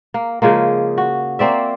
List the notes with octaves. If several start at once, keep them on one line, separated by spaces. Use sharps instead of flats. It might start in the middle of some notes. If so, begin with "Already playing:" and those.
A#3
C#3 F3 G#3 A#3
F#4
A#3 C4 D5 E5